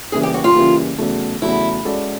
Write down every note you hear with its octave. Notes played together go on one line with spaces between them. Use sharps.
C#3 E3 G3 A#3 G#4
G4
F#4
F4
C#3 E3 G3 A#3
E2 C#3 F#3 A3
E2 C#3 F#3 A3 E4
G#3 C#4 F#4 A4 D5